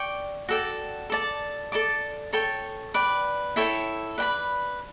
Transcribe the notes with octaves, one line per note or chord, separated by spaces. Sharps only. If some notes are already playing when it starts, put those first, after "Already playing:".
Already playing: D5 G5 C#6
F#4 A4 D5 G5
A4 D5 A5
A4 D5 A5 D6
A4 C#5 G5 C#6
B4 D5 G5
E4 A4 C#5 G5
B4 D5 G5 B5